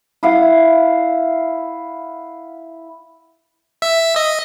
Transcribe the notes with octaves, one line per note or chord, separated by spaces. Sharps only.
E4 F5 F#5
E5
D#5